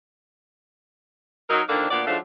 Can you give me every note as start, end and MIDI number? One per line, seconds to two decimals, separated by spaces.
1.50 1.62 54
1.50 1.62 63
1.50 1.62 70
1.69 1.85 50
1.69 1.85 51
1.69 1.85 53
1.69 1.85 58
1.69 1.85 62
1.90 2.02 38
1.90 2.02 46
1.90 2.02 59
1.90 2.02 74
2.07 2.17 44
2.07 2.17 53
2.07 2.17 54
2.07 2.17 57
2.07 2.17 62
2.07 2.17 77